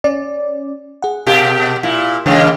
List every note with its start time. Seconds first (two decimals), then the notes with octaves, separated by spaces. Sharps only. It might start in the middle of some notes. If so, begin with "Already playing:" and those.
0.04 C#4 D5
1.02 G#4 F#5
1.27 B2 G4 A#4
1.83 A#2 E4
2.26 C#3 E3 G#3 A#3 C#5 G5